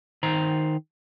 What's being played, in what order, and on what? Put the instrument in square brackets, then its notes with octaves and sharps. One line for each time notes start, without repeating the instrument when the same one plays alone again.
[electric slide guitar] D#3 C5 A#5